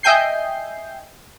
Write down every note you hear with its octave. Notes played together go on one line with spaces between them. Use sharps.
D#5 E5 G5 G#5 G6 C7